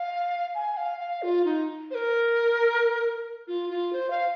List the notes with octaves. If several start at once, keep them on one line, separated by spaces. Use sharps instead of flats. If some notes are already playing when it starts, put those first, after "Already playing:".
Already playing: F5
G#5
F5
F5
F4
D#4
C5
A#4
F4
F4
C5
F5